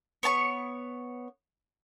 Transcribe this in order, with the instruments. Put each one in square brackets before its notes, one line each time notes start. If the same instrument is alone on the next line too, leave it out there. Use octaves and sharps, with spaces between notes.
[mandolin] B3 C#5 A5 C#6